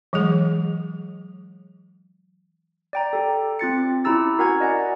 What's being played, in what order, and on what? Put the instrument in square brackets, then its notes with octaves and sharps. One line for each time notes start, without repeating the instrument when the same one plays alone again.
[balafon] E3 F#3 G#3 G#4
[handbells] D5 G5 A#5
G4 A4
C4 F4 A6 C#7
C#4 E4 G4 A#5 E6 A6
F#4 A#4 F#5 G#5 A#5 G#6
D5 D#5 F#5 G#5